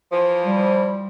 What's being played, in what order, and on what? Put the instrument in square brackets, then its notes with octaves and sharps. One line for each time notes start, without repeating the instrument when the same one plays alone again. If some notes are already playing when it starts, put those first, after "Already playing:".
[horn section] E3 F3
[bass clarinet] G3